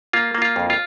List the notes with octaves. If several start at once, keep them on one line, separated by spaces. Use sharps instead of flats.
A#3 F4
A#3
F4
F2
F4